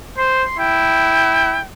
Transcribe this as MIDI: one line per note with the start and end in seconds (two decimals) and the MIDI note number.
0.18 0.44 72
0.18 0.56 84
0.59 1.61 64
0.59 1.63 79